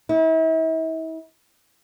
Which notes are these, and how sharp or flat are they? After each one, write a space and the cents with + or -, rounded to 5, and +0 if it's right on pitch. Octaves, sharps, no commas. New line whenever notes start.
E4 -40